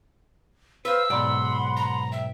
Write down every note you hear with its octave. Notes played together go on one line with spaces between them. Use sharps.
B4 C5 F5 E6 F6
B1 G#2 D5 F#5 B5 C6
A#5
E5 G5